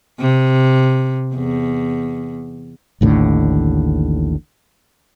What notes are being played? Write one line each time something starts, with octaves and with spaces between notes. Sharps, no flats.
C3
E2
A1 D#2 A2 D3